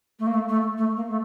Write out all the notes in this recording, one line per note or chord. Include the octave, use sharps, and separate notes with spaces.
A3
A#3
A3
A3
A3
A#3
A3